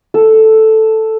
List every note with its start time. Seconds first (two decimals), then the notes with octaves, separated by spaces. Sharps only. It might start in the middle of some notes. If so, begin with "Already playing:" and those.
0.14 A4